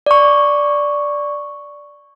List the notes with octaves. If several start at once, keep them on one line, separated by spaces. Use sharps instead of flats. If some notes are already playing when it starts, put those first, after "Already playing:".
D5 C#6